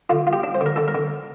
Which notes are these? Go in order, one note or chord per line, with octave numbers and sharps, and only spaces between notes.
D3 F4
F4
G4
D4
C5
D3 A#4
D3 A4
A#4
D3